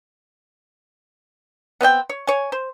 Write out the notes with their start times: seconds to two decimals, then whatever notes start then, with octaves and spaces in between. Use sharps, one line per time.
1.81 B3 C4 D#5 G5
2.09 C#5
2.27 C#5 G#5
2.52 C5